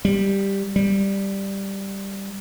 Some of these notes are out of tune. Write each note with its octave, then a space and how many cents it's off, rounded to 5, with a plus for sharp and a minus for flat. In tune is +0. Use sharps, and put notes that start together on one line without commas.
G3 +5
G3 +5